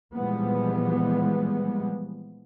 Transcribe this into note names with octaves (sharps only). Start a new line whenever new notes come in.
A#2 E3 F3 G3 G#3 B3